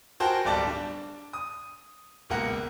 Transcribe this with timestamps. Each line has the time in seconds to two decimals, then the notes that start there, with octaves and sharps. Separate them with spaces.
0.20 F#4 G#4 A#4 C5 G5 A5
0.45 D1 G1 G3 D5 A5
0.67 D4
1.33 D#6
2.30 E1 C#2 A#3 A#4 F#5